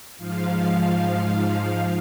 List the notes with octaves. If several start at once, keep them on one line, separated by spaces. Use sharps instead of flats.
G#2 F3 F5